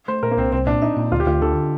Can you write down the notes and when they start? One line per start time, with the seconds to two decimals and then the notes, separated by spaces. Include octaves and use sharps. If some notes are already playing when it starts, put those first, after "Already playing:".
0.08 A3 C5
0.23 A#2 A#4
0.31 A#3
0.37 C2 C4
0.52 C2 C4
0.67 A#2 D4
0.82 D4 D#4
0.96 A#2
1.12 D2 F4
1.20 G4
1.26 D2 F4
1.42 D3 A4